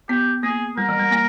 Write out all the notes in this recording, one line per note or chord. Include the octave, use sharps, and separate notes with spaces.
B3 G4
A#3 G#4
G3 A#4
E3
G3
A#3